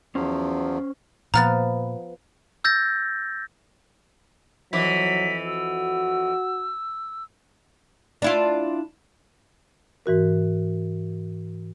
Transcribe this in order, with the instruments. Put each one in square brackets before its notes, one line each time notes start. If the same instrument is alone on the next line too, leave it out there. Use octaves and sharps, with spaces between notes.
[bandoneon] E2 F3 F#3 [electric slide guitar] C#4 C5
[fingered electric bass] A#2 [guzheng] F3 B3 B4 [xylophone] A#5 F6 A6
[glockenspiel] E6 G6 A6 A#6
[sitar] F2 E3 [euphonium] F#3 [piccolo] B6
[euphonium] F#4 [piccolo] E6
[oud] D4 E4 F4
[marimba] G#2 E3 F#4 A#4